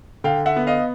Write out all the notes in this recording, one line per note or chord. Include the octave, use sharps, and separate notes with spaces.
D3 F5 G5
E5 F#5
B3
D#5 F5